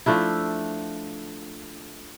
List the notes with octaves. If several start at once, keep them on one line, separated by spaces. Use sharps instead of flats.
F3 A3 D4 E4